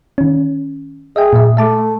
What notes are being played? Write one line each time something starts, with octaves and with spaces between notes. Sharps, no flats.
D#3 C#4
G#4 D#5 E5 G5
A#2 E5
A3 E5 A5 D6